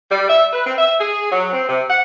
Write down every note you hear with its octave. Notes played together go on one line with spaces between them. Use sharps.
G3
E5
B4
C4
E5
G#4
F#3
C4
C3
F#5